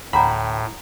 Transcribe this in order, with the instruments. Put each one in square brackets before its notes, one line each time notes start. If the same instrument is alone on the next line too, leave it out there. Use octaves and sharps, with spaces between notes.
[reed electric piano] D2 G5 [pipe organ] A2 [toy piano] F#5 A#5 D6 [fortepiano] B5